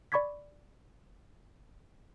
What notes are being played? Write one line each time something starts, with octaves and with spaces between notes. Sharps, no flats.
D5 B5 C#6 D6 G#6 B6